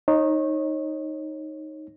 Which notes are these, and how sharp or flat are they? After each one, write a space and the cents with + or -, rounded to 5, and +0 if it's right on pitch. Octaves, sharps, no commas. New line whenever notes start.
D#4 +0 C#5 -30